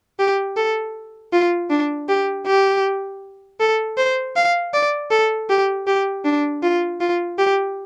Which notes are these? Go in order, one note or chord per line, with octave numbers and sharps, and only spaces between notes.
G4
A4
F4
D4
G4
G4
A4
C5
F5
D5
A4
G4
G4
D4
F4
F4
G4